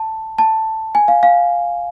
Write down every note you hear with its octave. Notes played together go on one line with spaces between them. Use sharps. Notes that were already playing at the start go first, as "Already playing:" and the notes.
Already playing: A5
A5
G#5
F5
F5